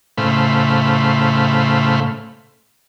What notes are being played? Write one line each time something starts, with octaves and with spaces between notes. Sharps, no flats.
A2 C#3 A3 C5 F5 B5